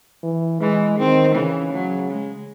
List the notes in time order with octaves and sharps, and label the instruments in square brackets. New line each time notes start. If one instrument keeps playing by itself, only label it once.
[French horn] E3
[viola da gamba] E3 [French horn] G#3
[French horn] D#3 [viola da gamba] C4
[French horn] C#3 [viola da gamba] E3
[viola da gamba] F#3
G#3